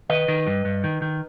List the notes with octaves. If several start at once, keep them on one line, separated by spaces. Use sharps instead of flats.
D#3 B4 D#5
D#3
G2
G2
D#3
D#3